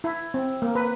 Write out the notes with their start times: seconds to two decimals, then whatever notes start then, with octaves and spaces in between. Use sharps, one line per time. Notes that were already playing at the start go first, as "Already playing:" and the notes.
0.04 E4
0.34 C4
0.62 A#3
0.75 B4